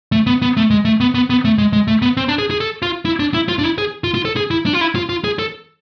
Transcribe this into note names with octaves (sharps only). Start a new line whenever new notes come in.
A3
B3
B3
A3
G#3
A3
B3
B3
B3
A3
G#3
G#3
A3
B3
C4
D4
G#4
G#4
A4
F4
E4
D4
E4
F4
D4
E4
G#4
F4
F4
A4
G#4
E4
D4
F4
E4
F4
F4
G#4
A4